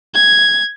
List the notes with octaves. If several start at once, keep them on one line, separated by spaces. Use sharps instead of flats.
G#6